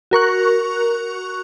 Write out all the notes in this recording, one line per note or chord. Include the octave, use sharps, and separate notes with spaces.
F#4 A#4 C#6 F#6